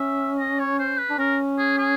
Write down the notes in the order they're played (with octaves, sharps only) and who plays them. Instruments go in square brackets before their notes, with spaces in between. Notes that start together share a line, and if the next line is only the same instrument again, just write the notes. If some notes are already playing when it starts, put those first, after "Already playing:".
Already playing: [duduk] C#4 [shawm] E5
[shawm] D#5
C#5
C5
B4
[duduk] D4
[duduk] C#4 [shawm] A#4
[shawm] G#4
G#4